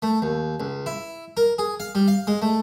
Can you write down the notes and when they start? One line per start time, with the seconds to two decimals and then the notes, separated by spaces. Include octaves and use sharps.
0.02 A3
0.22 D#2
0.60 C#2
0.86 E4
1.37 A#4
1.58 G#4
1.80 F5
1.95 G3
2.08 F5
2.27 G#3
2.42 A3